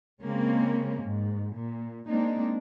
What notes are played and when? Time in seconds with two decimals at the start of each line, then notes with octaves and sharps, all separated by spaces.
0.21 C#3 G#3 A#3 C4 C#4
1.02 G#2
1.54 A#2
2.07 G#3 A#3 C4 D4 D#4